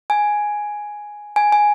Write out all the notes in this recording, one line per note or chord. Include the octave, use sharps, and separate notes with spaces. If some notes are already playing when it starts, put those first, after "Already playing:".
G#5
G#5
G#5